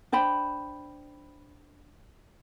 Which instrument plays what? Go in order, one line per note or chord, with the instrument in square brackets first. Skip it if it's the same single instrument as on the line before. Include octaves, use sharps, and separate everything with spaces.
[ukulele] D4 C5 G5 B5